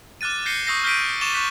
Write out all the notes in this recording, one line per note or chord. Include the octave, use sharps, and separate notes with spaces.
D6 F6 F#6 A6 D#7
G6 A#6 C7 C#7 D#7 G7
C#6 D#6 E6 G6 A#6 C7
F6 G6 A#6 B6 D7 D#7
C#6 D6 A6 E7 F7 G7
C#6 F#6 B6